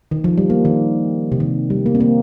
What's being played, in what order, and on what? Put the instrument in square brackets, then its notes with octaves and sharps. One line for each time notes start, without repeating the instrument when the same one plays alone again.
[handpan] D#3
F3
G3
A#3
D#3
C3
D#3
G3
A#3
C4
A#3